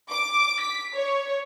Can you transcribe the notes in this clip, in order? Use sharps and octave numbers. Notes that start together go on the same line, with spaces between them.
D6
B6
C#5